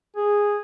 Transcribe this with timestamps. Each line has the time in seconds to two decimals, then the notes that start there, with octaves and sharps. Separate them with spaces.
0.17 G#4